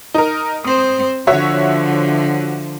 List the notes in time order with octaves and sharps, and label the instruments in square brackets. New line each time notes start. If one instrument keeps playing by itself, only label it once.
[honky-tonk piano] D#4 A#4
[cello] C4 C5 [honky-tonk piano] D#6
[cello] D3 F3 [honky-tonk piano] F#4 C#5 E5